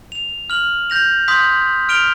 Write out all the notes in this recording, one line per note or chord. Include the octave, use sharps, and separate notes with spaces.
F7
F6 F#7
G6 A#6 F7
C6 D#6 G6 B6
F6 D7 F7 G7